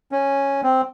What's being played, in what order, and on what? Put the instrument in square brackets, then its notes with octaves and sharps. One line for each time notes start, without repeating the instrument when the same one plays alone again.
[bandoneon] C#4
C4